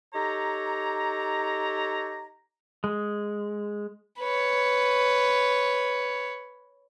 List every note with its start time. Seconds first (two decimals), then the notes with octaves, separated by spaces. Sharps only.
0.14 D#4 G4 A4 C#5 A#5
2.84 G#3
4.20 B4 C#5